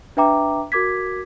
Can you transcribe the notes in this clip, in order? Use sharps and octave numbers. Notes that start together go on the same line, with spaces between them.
D4 B4 E5 G5 A#5 D6
F#4 A#4 D6 G#6 B6